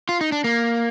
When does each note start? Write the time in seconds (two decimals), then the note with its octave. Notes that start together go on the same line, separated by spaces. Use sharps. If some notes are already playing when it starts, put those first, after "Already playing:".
0.09 F4
0.21 D#4
0.32 D4
0.44 A#3